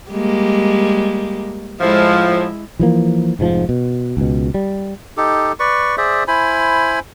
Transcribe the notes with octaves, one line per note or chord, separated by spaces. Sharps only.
G3 G#3 A#3
A2 F3 G#3 E4
E3 F3 A#3
F1 G#2 C3 F3
B2
C#2 B2
G3
D#4 G4 A4
B4 D5 C#6
G#4 C5 D5 E5
E4 C5 G#5 B5